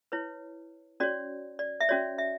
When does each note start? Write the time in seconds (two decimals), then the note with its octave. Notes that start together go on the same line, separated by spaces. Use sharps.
0.12 E4 B4 C#5
1.00 C#4 F#4 C#5 D5
1.59 D5
1.81 E5
1.89 C#4 F#4 C#5 D5
2.18 E5